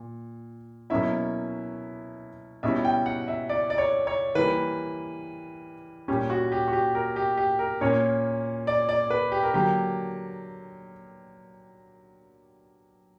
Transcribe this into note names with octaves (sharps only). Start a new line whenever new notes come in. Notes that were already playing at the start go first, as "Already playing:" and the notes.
Already playing: A#2
B2 F#3 A#3 C#4 E4 E5
B2 G3 C#4 E4 E5
G5
F#5
E5
D5
D5
C#5
C#5
E3 G3 A#3 B4
A#2 G3 C#4 G4
F#4
G4
F#4
G4
A#4
G4
G4
A#4
A#2 A#3 C#4 C#5
D5
D5
B4
G4
A#4
D3 F#3 A#3 G4